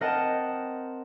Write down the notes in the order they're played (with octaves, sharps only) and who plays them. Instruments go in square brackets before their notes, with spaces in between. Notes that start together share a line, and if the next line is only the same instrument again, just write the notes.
[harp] C4 A#4 D#5 F#5 G5 A5